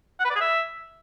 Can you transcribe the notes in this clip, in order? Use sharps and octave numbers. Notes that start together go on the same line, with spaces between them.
F#5
B4
D5
G#4
E5